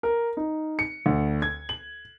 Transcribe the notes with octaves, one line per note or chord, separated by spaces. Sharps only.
A#4
D#4
C#7
D2
G#6
F#7